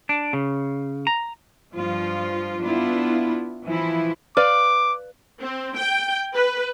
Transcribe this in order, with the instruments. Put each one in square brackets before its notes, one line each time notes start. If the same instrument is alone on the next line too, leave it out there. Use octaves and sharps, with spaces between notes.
[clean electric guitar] D4
C#3
A#5
[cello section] G2 F3 F4
B3 D4 E4 F4
E3 F3 E4
[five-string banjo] B4 D5 F5 [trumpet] D6
[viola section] C4
G5
B4